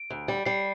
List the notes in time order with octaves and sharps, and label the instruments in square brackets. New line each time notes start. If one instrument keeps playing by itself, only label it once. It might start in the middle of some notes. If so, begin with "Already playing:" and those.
Already playing: [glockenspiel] D7
[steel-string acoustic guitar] D2
G3
[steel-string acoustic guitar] G3 [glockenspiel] C7